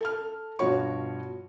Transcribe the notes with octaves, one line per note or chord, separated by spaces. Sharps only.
A4 A5 F6
G2 B2 F3 F#4 C#5 C#6